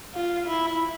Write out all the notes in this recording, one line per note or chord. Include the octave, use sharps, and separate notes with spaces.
F4
E4